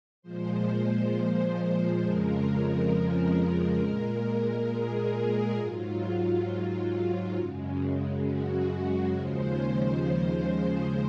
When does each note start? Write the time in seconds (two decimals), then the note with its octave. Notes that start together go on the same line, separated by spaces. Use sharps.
0.22 A#2 F3 G#3 C5
2.01 F2 C#3 F3 G#3 A#4
2.46 A#4
3.79 A#2 G#3
4.68 G#4
5.58 G#2 F#3 F4
7.36 F#2 C#3 G#3
8.25 F#4
9.14 D#2 C#3 F3 G#3 C5